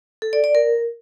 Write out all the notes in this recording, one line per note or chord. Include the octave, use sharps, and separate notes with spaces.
A4
D5
D5
A#4